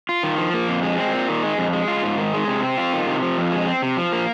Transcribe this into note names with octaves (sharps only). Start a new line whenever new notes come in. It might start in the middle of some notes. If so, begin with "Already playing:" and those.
F4
D#3
F3
A#3
F2
G#3
C4
A#2
D#3
G#3
F2
G#3
F4
G#2
D#3
G#3
C3
C4
F4
D#3
C3
F3
F2
G#3
C4
C3
F3
A#3